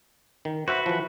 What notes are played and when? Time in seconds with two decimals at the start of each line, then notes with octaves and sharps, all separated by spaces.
0.45 D#3
0.68 F#4 B4 C5 E5 F#5
0.86 E3 F3